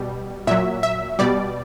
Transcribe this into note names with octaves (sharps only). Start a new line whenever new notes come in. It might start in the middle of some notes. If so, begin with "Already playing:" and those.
Already playing: B2 G3
A#2 F#3 E5
E5
B2 G3 D5